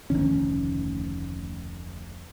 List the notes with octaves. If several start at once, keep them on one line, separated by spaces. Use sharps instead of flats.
F1 D2 D#3 C#4